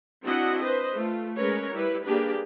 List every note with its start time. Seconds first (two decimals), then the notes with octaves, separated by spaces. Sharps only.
0.23 C4 D4 E4 F#4 D#5 F#5
0.60 B4 C5 D#5
0.92 A3 F4
1.36 G#3 C#4 A#4 B4 C#5
1.72 G3 E4 B4
2.04 A#3 D4 G4 G#4 B4